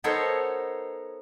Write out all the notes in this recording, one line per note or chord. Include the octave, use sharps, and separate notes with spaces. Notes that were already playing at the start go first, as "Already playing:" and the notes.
B3 D#4 A4 A#4 C5 C#5